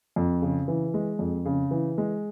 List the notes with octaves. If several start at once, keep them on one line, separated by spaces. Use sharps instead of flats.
F2
C#3
E3
G#3
F2
C#3
E3
G#3